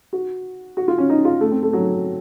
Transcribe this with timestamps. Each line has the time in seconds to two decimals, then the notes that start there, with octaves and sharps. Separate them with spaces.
0.13 F#4
0.77 F#4
0.88 F4
0.98 C#4
1.10 D#4
1.25 F4
1.41 A3
1.51 C4
1.63 A3
1.73 F#3